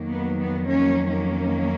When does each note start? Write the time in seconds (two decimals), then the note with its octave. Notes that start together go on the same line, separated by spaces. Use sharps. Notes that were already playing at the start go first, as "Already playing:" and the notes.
Already playing: F2 D#3 F#3 A#3
0.09 B3
0.39 B3
0.67 A#3 C#4
1.11 A#3 C#4